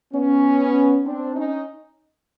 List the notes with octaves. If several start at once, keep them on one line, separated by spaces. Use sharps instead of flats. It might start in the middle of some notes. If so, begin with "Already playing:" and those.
B3 C#4
C4 D4
C#4 D#4